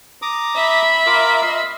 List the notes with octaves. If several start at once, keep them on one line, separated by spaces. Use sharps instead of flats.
A#5 D6 D#6
E5 B5
F4 A#4 D6
D#5 C6